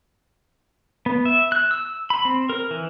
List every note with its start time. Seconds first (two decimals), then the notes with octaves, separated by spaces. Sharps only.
1.06 B3
1.25 E5
1.52 F#6
1.71 E6
2.10 B5
2.25 C4
2.49 A#4
2.71 E3